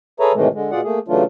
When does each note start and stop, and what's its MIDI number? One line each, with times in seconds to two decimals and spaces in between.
0.20 0.32 68
0.20 0.32 69
0.20 0.32 71
0.20 0.32 73
0.20 0.32 76
0.20 0.32 82
0.34 0.48 45
0.34 0.48 48
0.34 0.48 51
0.34 0.48 52
0.34 0.48 56
0.34 0.48 57
0.53 0.71 50
0.53 0.71 56
0.71 0.81 47
0.71 0.81 65
0.71 0.81 68
0.71 0.81 74
0.71 0.81 78
0.83 0.99 57
0.83 0.99 58
0.83 0.99 68
1.08 1.24 49
1.08 1.24 52
1.08 1.24 54
1.08 1.24 57
1.08 1.24 62
1.08 1.24 65